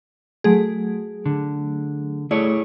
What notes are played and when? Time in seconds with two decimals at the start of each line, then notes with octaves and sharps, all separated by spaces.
0.44 F#3 A3 G#4
1.26 D3
2.31 A3 E4 G#4 C#5 D5